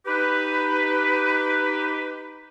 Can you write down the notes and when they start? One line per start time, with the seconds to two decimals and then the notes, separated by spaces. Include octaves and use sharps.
0.06 D#4 G4 B4